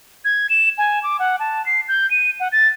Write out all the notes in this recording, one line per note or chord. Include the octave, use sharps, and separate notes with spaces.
G#6
E7
G#5
D6
F#5
A5
C7
G6
D#7
F#5
A6